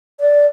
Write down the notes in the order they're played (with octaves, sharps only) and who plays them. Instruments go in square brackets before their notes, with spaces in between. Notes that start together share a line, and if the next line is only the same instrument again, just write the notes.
[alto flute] D5